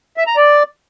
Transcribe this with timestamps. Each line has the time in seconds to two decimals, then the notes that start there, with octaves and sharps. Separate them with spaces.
0.17 E5
0.27 A#5
0.37 D5